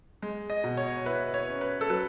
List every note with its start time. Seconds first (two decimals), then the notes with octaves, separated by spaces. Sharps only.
0.22 G#3
0.50 D#5
0.64 B2
0.77 C#5
1.06 E4 B4
1.34 C#5
1.48 C#4
1.61 B4
1.81 A4
1.89 F#3 B4